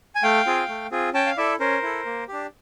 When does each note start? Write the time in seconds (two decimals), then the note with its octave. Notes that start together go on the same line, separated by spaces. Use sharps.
0.15 G#5
0.23 A3 F5 G5
0.46 C4 F4 G#4
0.69 A3
0.91 C4 F4 G#4
1.14 C#4 G5 A5
1.26 F5
1.37 E4 A4 D5 E5
1.60 C#4 A#4 C5
1.83 E4 A4
2.06 A#3
2.28 D4 G4